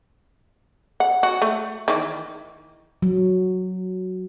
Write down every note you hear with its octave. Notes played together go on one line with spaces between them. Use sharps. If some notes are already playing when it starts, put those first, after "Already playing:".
F#5
F#4
A3
D#3 E3
F#3